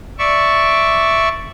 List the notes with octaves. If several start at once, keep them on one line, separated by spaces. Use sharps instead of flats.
D5 E5 C#6